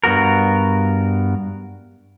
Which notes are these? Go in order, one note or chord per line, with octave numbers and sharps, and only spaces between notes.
G2 B3 F#4 A#4